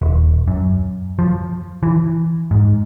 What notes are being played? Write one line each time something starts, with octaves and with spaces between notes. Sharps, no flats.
D#1
F#2
F3
E3
G#2